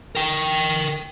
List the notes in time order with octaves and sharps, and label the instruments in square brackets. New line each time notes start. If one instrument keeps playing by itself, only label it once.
[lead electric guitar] A#4 G5